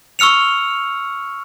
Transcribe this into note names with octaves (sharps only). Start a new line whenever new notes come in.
C#6 E6 F6 C#7 F7